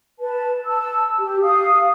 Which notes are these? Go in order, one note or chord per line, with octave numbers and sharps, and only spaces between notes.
B4 A5
A5 E6
G4
F5 D#6